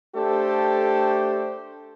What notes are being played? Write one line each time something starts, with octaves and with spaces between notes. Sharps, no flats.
A3 D4 G4 A4 C5